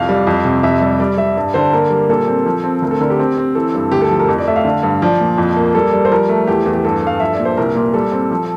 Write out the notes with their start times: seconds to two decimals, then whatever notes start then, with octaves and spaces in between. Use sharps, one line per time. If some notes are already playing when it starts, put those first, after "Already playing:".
Already playing: C2 F2 F5
0.09 G3
0.27 F2
0.45 C3
0.63 F2 E5
0.81 G3
1.00 G3 D5
1.18 G3 E5
1.37 G2
1.54 D3 C5
1.73 A#3 A#4
1.91 G3
2.09 A#2 A4
2.28 C4
2.46 F3
2.64 C4
2.82 D2 A#4
2.91 A4
3.01 D3 A#4
3.10 G4
3.19 C4
3.38 C4
3.55 E3 A4
3.74 G2
3.92 D2 G4
4.02 A4
4.10 F3
4.20 A#4
4.29 F2
4.38 D5
4.47 A3 E5
4.56 F5
4.65 D3
4.83 G2
5.02 F3 D5
5.20 A#2
5.38 F2
5.57 A#3
5.75 G3 A4
5.93 G3
6.05 C5
6.11 F3 A#4
6.29 A3
6.47 E2 G4
6.66 E2
6.73 G4
6.84 G2 A4
7.02 G2 F5
7.20 F3 E5
7.33 D5
7.40 A#2
7.45 C5
7.57 C2 A#4
7.75 A#2
7.94 G3 A4
8.12 C4
8.31 F3